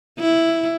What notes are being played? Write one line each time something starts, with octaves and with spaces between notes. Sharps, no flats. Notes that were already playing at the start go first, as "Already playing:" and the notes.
E4